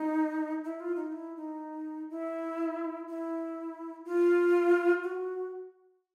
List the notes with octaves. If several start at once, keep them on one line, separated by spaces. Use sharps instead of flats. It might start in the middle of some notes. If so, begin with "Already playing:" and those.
Already playing: D#4
E4
F4
D#4
E4
D#4
E4
E4
F4
F#4